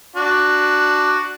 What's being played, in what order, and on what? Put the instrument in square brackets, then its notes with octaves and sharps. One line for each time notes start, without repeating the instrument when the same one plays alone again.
[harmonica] D4 F#4